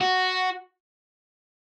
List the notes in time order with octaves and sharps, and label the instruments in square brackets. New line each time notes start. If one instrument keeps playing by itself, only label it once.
[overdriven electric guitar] F#4